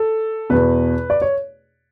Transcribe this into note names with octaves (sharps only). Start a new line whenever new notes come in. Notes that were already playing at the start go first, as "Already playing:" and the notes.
Already playing: A4
E2 B2 B4
D5
C#5